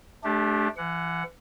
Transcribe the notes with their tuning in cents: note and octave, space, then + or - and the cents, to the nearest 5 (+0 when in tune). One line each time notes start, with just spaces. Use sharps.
A3 -30 D4 +0 G4 +0
E3 +35 F#5 +0